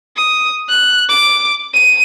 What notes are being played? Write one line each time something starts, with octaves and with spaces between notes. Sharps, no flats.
D#6
F#6
D6
D#7